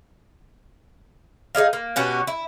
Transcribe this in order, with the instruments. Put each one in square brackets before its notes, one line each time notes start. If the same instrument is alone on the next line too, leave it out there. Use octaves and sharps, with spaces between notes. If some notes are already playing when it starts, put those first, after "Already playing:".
[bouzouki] D#4 G#4 D#5 F5
A#3
B2 C#4 F#4 G4
E4